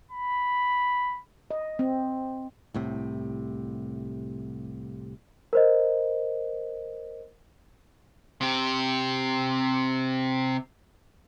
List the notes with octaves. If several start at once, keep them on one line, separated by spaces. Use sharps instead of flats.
B5
D#5
C4
C2 A2 C3
A#4 C5 D#5
C3 G4